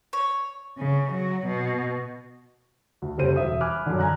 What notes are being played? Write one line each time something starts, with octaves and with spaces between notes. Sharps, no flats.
C#5
C#3
F#3
B2
D2
F#1 G3 C#4 A4 C5 D#7
E1 E5 D#6
G#5 B5 D6 F6 F#6
F#2 D3
G#5 A#5 F#6